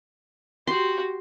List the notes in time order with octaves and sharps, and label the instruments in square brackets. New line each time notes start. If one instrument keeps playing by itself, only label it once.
[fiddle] F#4 G4 [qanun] C6